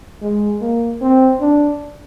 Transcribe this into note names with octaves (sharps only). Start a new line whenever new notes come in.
G#3
A#3
C4
D4